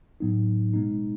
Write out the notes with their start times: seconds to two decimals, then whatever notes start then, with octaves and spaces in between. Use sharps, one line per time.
0.20 A2 F#3 B3 D#4
0.74 B2 G#3 B3 D#4